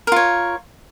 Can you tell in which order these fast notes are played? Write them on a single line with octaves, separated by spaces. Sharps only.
A#4 F4 C#5